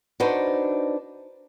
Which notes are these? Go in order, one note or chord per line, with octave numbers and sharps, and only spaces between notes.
D4 D#4 F#4 B4 C5